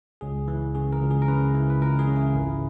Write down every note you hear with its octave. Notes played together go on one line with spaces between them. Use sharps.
C#2 G#4
E3
C#3 G#4
A#4
C#2
G#4
A#4
C#3 B4
E3
B4
C#2 A#4
G#4
C#3
E4
G#1